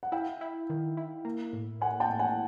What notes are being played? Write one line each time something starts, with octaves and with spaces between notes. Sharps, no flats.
F#5
E4 F5 G5
E4
D#3
E4
A#3
A2
A#3 F#5 G#5
G5 A5
A2
F#5 G#5